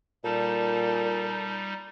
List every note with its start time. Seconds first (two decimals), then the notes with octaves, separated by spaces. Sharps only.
0.24 A#2 G3 D#4 A4